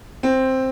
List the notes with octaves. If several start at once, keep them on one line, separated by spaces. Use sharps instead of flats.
C4